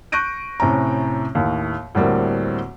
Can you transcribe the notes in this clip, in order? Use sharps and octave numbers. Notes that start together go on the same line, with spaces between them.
C#6 F#6 G6 A#6 D7 D#7
A2 C3 C#4 A#5
D#2 A2
D2 A2 G3 A#3 C4